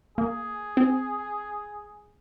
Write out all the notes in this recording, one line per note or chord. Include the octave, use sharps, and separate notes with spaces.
A#3 G#4
C4